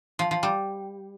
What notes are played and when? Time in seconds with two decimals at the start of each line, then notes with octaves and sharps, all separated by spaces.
0.19 F3
0.31 F3
0.43 G3